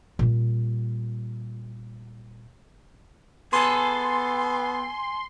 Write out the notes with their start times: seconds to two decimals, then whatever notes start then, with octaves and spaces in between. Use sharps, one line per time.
0.19 A#2 G3
3.53 B3 G#4 A4 G#5 C6